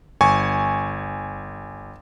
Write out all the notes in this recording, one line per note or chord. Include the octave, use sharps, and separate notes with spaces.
G1 G#5 C#6